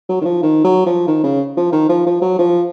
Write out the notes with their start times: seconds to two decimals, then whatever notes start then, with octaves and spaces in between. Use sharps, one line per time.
0.09 F#3
0.21 D#3
0.25 F3
0.43 D#3
0.64 F#3
0.86 F3
1.07 D#3
1.24 C#3
1.57 F3
1.72 D#3
1.89 F3
2.06 F3
2.22 F#3
2.39 F3